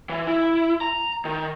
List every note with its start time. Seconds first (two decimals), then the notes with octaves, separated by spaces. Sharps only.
0.09 E3
0.27 E4
0.81 A#5
1.25 D#3